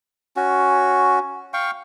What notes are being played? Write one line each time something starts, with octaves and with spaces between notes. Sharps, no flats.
C#4 F#4
F5 G5 C#6